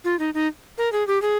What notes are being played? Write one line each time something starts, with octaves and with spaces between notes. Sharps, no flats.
F4
D#4
D#4
A#4
G#4
G4
G#4